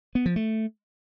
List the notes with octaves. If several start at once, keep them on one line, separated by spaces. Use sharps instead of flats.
B3
F3
A3